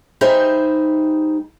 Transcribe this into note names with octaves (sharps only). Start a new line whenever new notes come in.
G3 D#4 G#4 C5 E5